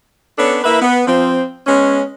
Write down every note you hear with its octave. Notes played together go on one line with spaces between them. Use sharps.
B3 C#4 D4 A4 C#5
A#3 E4 B4 E5
B3
F3 C4
G#3 B3 C#4